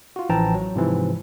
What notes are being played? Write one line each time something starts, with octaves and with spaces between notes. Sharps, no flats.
F4 F#4
A1 E3 F3 G5 A5 A#5
F#3
G#2 C3 E3 F3